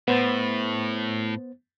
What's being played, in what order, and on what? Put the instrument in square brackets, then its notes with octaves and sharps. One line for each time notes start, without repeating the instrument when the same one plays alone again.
[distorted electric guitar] A2 [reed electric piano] B3 C5 A6